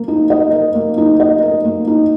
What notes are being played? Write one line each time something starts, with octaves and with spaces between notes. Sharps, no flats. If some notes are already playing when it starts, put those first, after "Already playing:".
Already playing: A#3 A#4
D#4
D#5
A#4
A#3
D#4
D#5
A#4
A#3
D#4